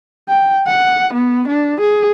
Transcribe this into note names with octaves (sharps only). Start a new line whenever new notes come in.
G5
F#5
B3
D4
G#4